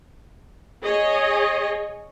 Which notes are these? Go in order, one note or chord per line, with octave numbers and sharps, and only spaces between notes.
G#4 C#5 D#5